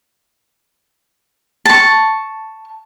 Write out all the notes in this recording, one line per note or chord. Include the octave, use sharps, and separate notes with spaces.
A5 C#6